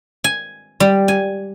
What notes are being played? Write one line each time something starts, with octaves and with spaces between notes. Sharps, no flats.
G#5
G3
G#5